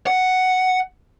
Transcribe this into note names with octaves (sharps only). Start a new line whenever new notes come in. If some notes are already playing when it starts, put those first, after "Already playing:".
F#5